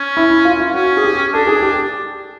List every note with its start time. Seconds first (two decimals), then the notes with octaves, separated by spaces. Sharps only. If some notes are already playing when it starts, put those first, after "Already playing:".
Already playing: C#4
0.17 E4
0.31 E4
0.45 F4
0.60 F4
0.74 C#4 F#4
0.97 G#4
1.04 G4
1.33 D4 A4
1.47 G#4
1.62 G4